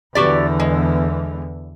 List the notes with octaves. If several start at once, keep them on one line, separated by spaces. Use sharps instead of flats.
E2 D3 E3 F#4 G4 D5
G#3